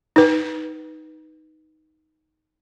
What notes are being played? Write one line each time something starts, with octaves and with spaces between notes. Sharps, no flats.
D#4 B4